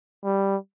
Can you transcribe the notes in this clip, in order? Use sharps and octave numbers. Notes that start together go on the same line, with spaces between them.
G3